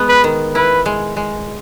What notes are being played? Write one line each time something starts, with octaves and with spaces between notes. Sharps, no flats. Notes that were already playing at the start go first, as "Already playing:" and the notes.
Already playing: G#3 B3
B4
D#3
E4 B4
G#3
G#3